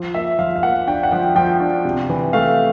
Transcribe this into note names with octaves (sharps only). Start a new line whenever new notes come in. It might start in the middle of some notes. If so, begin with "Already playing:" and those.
Already playing: F3
A#3 E5
F3 F5
F5
A#3 F#5
D4 G5
F#5
F3 G5
F3 G5
D4
C3
E3
A3 F5